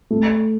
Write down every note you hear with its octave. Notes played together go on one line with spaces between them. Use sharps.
A3